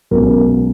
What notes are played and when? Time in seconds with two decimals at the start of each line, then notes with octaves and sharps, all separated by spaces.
0.11 B1 B2 G#3 C#4 A#4